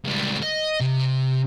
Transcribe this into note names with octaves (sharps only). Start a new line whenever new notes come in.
C#2 G3
D#5
C3